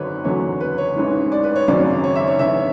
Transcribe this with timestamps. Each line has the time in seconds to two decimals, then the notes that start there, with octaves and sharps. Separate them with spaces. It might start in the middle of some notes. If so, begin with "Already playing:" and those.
Already playing: G#1 F#2 D3 F#3 B4 C#5
0.24 F#1 E2 D3 F#3 C#5
0.60 B4
0.78 C#5
0.96 A1 G#2 E3
1.32 D5
1.44 B4
1.56 C#5
1.68 G#1 F#2 C#3 F#3 D5
2.04 C#5
2.15 E5
2.28 C#5
2.39 D2 C#3 E3 E5
2.57 C#5